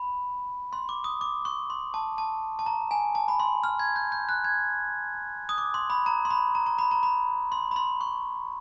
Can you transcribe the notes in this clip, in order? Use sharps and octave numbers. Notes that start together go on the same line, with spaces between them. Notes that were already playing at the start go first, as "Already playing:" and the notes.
Already playing: B5
C6
D6
D#6
D6
C#6
C6
A5
A5
A5
A#5
G#5
A5
B5
C6
F6
G#6
G6
G6
F#6
G#6
D#6
D6
C6
B5
A#5
C6
B5
A#5
A#5
B5
A#5
B5
C6
B5
C6
C#6